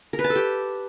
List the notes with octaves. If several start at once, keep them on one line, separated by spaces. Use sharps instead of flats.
A#4
B4
A5
A4
G4